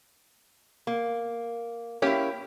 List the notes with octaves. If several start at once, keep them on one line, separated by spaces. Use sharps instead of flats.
A#3
A#3 C#4 E4 G4